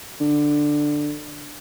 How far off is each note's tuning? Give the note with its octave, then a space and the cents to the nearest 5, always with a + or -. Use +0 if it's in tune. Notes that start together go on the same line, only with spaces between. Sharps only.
D3 +10